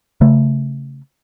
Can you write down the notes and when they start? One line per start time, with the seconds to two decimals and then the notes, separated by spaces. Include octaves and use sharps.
0.21 C#3 A3